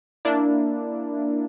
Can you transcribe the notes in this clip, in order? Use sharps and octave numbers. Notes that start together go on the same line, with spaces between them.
A#3 D4 E4